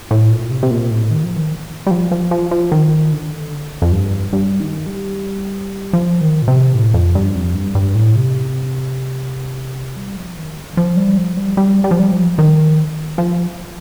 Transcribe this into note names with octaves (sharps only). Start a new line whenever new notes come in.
A2
A#2
C3
C3
A#2
A2
D#3
F3
D#3
G3
F3
F3
F3
F3
D#3
D3
F2
G2
G2
D#3
G3
F3
D#3
A#2
C3
A2
F2
G2
F2
G2
G2
A2
C3
G3
F3
D#3
D3
G3
F3
G3
F3
G3
G3
G3
F3
G3
F3
D#3
F3